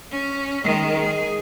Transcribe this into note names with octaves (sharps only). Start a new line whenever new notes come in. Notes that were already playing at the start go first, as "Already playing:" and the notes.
C#4
D#3 G#3
G#4